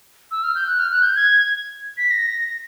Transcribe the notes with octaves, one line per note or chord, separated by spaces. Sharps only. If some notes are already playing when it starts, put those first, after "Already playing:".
E6
F6
G6
F#6
F6
F#6
G6
G#6
B6
A#6